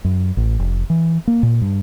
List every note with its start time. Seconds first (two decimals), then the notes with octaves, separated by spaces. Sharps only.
0.04 F#2
0.37 A1
0.59 F1
0.90 E3
1.27 A#3
1.43 A#2
1.62 G2